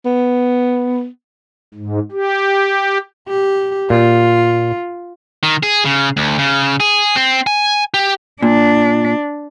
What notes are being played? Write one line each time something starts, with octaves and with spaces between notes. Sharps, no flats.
B3
G#2
G4
G4
A#2 F4
D#3
G#4
C#3
D2
C#3
G#4
C4
G#5
G4
A#2 D4